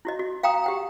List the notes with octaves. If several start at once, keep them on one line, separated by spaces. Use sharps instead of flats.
E4 F#4 D#5
F#4
F5 G5 A#5 C6 D#6
G4 F#5 G5